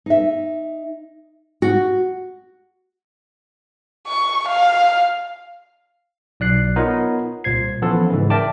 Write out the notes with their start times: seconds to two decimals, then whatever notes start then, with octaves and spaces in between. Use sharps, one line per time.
0.06 D#4 E5
1.62 F#4
4.07 C#6
4.48 F5
6.40 B1 D5 F#6 C7
6.76 B3 D#4 F4 A#4 C#5
7.44 C2 A#2 C5 G#6 C7
7.82 E3 F3 B3 C#4 A4
8.10 G#2 C#3 E3
8.30 A#4 D5 E5 G5 A5 D6